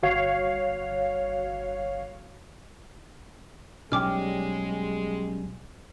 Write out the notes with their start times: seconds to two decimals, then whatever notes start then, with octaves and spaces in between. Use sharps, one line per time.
0.03 G1 F#4 C#5 F5
3.92 B1 G3 G#3 C#4 G5 D6 F6